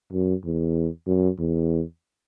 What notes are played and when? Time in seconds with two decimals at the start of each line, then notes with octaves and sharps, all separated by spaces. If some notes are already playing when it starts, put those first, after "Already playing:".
0.12 F#2
0.44 E2
1.07 F#2
1.39 E2